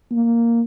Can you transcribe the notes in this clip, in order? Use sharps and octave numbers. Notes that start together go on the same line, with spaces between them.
A#3